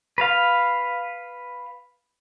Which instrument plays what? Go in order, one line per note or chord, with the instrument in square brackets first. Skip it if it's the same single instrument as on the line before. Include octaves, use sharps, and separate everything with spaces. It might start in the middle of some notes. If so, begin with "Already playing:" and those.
[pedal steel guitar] B4 F5